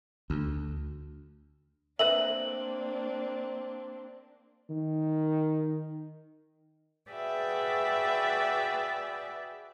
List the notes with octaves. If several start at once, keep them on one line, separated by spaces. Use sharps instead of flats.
D2
A#3 C4 D4 B4 D#5 E5 F#7
D#3
F#4 G#4 B4 D5 E5 G5